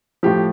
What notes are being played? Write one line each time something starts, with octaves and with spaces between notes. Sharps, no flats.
A2 F3 G4